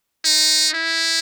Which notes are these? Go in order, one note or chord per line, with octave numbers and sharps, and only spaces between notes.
D#4
E4